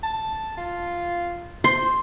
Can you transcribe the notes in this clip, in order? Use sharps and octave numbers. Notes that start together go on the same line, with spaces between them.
A5
F4
C5 C6